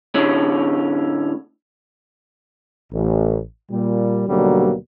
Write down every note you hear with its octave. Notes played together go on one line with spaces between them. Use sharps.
A2 D3 C#4
A1
A#2 G3
D#2 B2 D3 F#3 G3 A#3